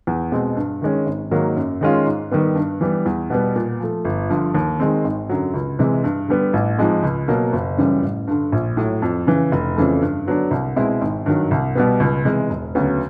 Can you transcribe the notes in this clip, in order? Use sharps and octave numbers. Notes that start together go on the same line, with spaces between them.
E2
B2 G#3 C4
G2
D#3 G#3 C#4
G#1
G#2 D#3 F#3 A#3
F#2
D#3 G#3 C#4 F4
G#2
D#3 G3 B3
G2
E3 G3 B3
E2
B2 G3 B3
A#2
F3 A3
G1
G2 D3 F3
D#2
D#3 G#3 C4
G#1
F#2 D3 F#3
C#2
C3 E3 G#3
G2
D3 G3 B3
A1
G#2 F3 G#3 C4
C#2
B2 F#3 A#3
F#1
F#2 C#3 E3 G3
A1
G2 D3
A#1
A2 F#3
F2
C#3 E3
F1
F2 C#3 E3 A3
G2
D3 F#3 B3 D4
C2
B2 G#3 C4 E4
G#1
G2 D#3 F#3
C2
B2 G3 B3
C#2
C3 E3 G#3
E1
D2 C#3 F#3 B3